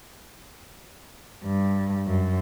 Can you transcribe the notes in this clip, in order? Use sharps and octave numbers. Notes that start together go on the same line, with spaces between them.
G2
F#2